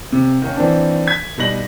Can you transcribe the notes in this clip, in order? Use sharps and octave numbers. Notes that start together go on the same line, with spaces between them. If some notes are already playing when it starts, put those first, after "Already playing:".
C3
D#3 A#3 C#4
D#3 E3 A#3 C4 D4
G#6 B6
B2 G3 D#4 A#6 F#7